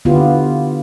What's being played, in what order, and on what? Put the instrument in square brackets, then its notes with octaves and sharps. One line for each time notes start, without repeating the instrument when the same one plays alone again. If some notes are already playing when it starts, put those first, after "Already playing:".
[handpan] D3 B3 E4 F4 G4